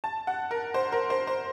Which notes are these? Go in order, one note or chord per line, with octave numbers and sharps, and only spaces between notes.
A5
F#5
A#4
C5
A#4
C5
C5